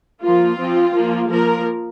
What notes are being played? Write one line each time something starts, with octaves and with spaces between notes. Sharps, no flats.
F3 A#3 F4
F3 C4
F3 A#3
F3 A#3 A#4